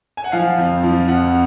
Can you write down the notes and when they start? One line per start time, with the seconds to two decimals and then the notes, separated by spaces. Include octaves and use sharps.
0.17 G#5
0.24 F#5
0.32 F3 F5
0.58 F2
0.83 F3
1.08 F2 F#5